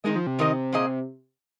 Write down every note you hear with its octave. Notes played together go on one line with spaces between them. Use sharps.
D#3 G#3 C4 D#4 A#4 D#5
F3
C3
D#3 C4 D#4 A#4 D#5
A#2 A#3 G#4 D#5